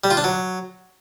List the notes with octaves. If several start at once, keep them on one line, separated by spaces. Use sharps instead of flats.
G3
F4
D4
F#3